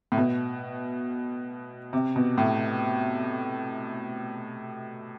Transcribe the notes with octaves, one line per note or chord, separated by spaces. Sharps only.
A2
B2
C3
B2
A2